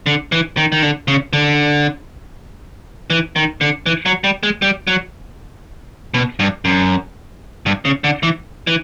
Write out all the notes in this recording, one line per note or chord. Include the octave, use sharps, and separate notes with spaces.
D3
E3
D#3
D#3
D3
C#3
D3
E3
D#3
D3
E3
F#3
G3
G#3
G3
F#3
B2
G2
F#2
G2
C#3
D3
E3
E3